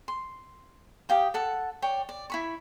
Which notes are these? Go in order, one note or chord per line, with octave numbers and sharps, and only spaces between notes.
C6
G4 F5 G5 D#6
A4 F#5 A5
C#5 D5 G5
D5
E4 B5 C#6